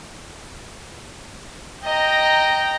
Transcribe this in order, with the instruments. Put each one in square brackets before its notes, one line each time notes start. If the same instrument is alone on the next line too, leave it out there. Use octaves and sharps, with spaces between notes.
[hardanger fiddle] D#5 A#5 [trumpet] G5